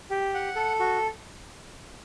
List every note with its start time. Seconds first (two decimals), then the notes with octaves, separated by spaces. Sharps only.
0.10 G4
0.34 F#5
0.56 A4
0.80 F#4